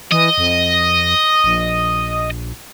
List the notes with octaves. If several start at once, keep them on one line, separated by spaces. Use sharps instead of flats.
E3 D#5
F2
A#1